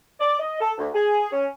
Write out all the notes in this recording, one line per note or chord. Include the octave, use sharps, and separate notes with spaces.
D5
D#5
A4
D2
G#4
C#4